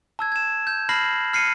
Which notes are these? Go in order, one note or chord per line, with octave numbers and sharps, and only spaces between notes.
A5 E6 G#6
G#6 E7
G6
A5 B5 F6 A#6 C7 F#7
F6 C7 C#7 D#7